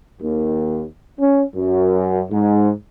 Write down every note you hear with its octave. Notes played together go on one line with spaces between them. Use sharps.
D#2
C#4
F#2
G#2